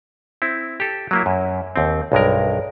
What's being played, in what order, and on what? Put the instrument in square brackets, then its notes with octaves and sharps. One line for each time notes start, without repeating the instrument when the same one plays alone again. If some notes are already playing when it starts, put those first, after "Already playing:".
[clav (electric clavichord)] C4 E4
G4 A4
F#3 A#3 E4
F#2
D#2 C4
B1 G2 G#3 A#4